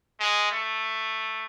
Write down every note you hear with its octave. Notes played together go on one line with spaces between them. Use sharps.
G#3
A3